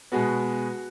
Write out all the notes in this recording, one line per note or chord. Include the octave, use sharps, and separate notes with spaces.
B2 G#3 B3 F#4